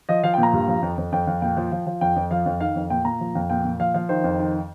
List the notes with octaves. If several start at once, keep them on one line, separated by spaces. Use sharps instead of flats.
F3 D#5
F3 F5
G5
A#2 A#5
G2
F3
F2
F2
F2 G5
F2
A#2 G5
F3
F3
F3
F2 G5
F2
F3 F5
F2
D#3 F5
F2
A#2 G5
A#2 A#5
F3
F2
A#2 G5
A#2
F3 F5
F3 F5
D#3 C5
F2
D#3